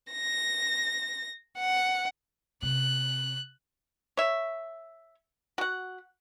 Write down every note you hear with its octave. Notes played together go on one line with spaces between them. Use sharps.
A#6
F#5
C3 F#6
C#5 E5
F#4 F#5